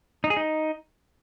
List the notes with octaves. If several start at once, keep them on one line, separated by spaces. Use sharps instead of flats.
D#4
G#4
D#4